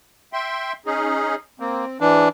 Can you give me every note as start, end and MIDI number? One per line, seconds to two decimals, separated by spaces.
0.33 0.73 76
0.33 0.73 79
0.33 0.73 84
0.86 1.35 61
0.86 1.35 63
0.86 1.35 68
1.60 1.85 58
1.60 1.98 60
2.00 2.27 44
2.00 2.29 52
2.00 2.29 62